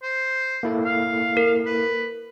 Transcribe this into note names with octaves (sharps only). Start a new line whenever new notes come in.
C5
A#3 E4 A4
F5
A#4
B4